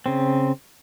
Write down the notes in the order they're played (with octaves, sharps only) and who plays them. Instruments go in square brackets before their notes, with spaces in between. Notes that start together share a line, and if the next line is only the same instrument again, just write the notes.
[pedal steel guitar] C#3 C4